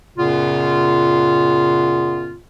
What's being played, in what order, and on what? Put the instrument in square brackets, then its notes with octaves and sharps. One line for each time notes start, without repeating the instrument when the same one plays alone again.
[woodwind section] F#2 A#2 C#3 B3 F4